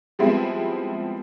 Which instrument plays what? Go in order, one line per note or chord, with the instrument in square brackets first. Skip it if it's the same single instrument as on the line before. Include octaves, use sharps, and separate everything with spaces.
[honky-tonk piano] F3 G3 G#3 B3 C4 E4